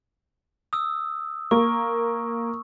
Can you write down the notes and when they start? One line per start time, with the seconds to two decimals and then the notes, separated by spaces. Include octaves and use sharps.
0.73 D#6 E6
1.51 A#3 C#6